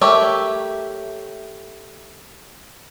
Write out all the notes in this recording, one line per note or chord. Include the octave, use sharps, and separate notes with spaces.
A3 G4 A#4 C#5 E5